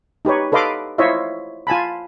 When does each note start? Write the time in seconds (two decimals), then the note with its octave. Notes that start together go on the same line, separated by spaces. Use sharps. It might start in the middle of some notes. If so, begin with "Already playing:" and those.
0.25 D#4 G4 B4 C#5
0.52 A4 B4 D#5 F5 C6 D6
0.98 E4 F4 C5 C#5 D#5 E5
1.67 F4 G#5 A5 B5